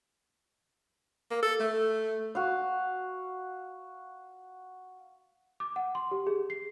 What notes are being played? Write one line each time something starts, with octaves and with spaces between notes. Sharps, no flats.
A#3
A4
A3
F#4 F5
D6
F#5
C6
G4
G#4
C7